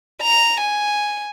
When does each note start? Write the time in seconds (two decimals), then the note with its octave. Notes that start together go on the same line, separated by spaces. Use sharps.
0.22 A#5
0.60 G#5